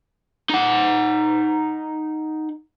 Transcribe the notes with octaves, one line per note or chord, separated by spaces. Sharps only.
D#4 F#5